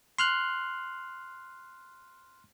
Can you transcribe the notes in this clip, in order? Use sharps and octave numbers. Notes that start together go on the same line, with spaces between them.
C6 F6 F#6